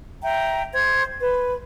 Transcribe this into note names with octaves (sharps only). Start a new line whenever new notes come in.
E5 G5 A#5
C5 G#6
B4